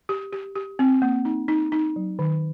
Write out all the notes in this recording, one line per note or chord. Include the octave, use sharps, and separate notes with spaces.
G4
G4
G4
C4
A#3
D#4
D#4
D#4
F#3
D#3